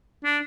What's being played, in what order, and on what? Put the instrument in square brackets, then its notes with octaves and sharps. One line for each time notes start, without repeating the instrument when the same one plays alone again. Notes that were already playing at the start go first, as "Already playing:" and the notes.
[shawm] D4